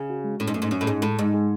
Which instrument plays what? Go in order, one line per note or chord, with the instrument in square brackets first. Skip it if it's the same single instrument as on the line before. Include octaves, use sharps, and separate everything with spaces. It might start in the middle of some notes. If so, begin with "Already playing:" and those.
Already playing: [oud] C#3
[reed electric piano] F#4
G#3
[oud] A2 [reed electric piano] C#4
[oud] G#2
[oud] F#2 [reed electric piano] A3
[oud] G#2
[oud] F#2 [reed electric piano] C#4
[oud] A2
[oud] G#2 [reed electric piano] G#4
[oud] A2 [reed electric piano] G#3
[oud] G#2 [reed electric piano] G#3
[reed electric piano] G#3